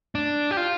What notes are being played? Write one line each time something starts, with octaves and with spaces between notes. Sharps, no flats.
D4
G4
F4